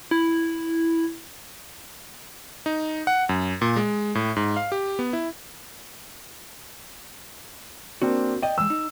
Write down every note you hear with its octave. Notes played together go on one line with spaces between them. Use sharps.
E4
D#4
F#5
F#2
A#2
G#3
A2
G#2
F5
G4
B3
E4
A#3 C4 D4 F#4
D5 D#5 G5
E3 G#3 E6
D#4